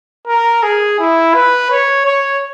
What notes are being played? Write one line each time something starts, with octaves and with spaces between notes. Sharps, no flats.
A#4
G#4
E4
B4
C#5
C#5